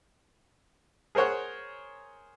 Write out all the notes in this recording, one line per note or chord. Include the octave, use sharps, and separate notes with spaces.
G#4 A#4 C5 C#5 F#5